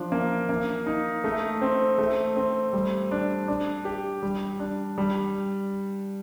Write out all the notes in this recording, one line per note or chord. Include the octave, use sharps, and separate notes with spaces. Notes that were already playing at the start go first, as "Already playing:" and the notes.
Already playing: F3 D4
A#3
A#3
D#4
A3
C4
A3
C4
G3
D4
D4
G4
G3
D4
G3